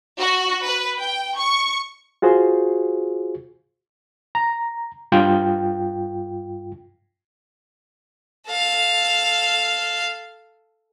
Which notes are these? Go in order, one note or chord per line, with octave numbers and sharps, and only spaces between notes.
F#4
B4
G5
C#6
F4 F#4 G#4 C5
A#5
G2 F4 G5
A4 F5